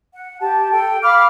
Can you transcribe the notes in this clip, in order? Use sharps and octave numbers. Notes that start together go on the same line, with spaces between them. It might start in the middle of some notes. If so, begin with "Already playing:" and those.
F#5
G4 A5
A4 G5
F5 B5 D6 F6